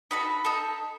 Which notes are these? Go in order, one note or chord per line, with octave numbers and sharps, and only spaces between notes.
D#4 F#4 A4 B5
D#4 A4